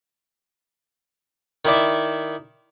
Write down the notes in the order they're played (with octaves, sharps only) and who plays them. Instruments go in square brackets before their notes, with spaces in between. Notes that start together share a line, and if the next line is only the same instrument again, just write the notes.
[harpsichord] D#3 E4 D5 E5